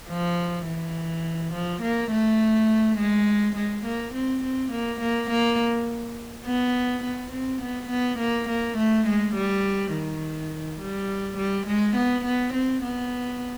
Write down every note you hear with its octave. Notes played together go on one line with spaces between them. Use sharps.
F3
E3
F3
A#3
A3
G#3
G#3
A#3
C4
C4
A#3
A#3
A#3
B3
B3
C4
B3
B3
A#3
A#3
A3
G#3
G3
D#3
G3
G3
G#3
B3
B3
C4
B3